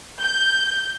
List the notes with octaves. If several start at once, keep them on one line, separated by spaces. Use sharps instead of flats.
G6